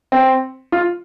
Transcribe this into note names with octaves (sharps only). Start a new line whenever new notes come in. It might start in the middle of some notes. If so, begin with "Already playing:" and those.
C4
F4